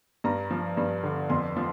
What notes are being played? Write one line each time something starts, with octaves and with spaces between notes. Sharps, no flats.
G2 A#5
F3
G2
D3
F2 C6
F3